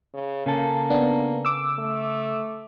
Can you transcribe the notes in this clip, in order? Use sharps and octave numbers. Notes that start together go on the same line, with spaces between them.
C#3
C#3 A#3 C#4 A4
B3 D4
D6 E6
A3